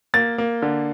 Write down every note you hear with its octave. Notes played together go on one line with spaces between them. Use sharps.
A#3 A6
A#3
D3